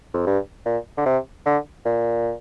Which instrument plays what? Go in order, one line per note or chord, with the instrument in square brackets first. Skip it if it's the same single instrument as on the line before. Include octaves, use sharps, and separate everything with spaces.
[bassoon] F2
G2
A#2
D3
C3
D3
A#2